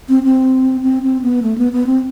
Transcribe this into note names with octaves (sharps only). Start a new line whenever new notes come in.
C4
C4
C4
C4
B3
A3
B3
B3
C4